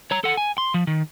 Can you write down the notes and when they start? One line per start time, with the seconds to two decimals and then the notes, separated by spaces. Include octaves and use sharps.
0.11 C#5 A#5
0.24 A4 F#5
0.37 G#5
0.58 C6
0.74 F3
0.87 D#3